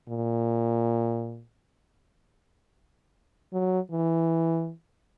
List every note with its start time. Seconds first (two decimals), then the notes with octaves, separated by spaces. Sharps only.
0.09 A#2
3.53 F#3
3.91 E3